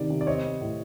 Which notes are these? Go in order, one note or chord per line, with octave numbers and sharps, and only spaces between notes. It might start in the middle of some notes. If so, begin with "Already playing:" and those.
Already playing: C3 D#3 D5
C3
D5
C4 C#5 D#5
C4
A2